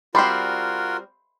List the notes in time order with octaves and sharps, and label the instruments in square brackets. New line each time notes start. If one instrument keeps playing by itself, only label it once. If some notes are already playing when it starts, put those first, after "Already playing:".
[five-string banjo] G3 C4 [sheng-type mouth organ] F4 F#4 A#4 [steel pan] B5 C6